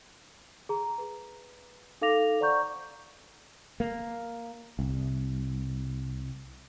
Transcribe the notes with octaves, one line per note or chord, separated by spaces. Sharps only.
G#4 A#5
B4
D#4 A4 F5 D6 A#6 F7
C5 D5 F#5 A#5 C#6 G6
A#3
C2